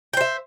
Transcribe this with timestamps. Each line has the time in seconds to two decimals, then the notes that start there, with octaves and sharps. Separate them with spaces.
0.13 G5
0.17 C5
0.21 E5